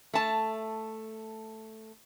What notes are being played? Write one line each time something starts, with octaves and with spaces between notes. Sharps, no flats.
A3 A5